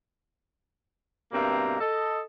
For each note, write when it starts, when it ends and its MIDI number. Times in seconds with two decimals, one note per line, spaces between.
1.32 1.77 43
1.32 1.77 47
1.32 1.77 58
1.32 1.77 60
1.32 1.77 76
1.32 1.77 82
1.79 2.22 69
1.79 2.22 75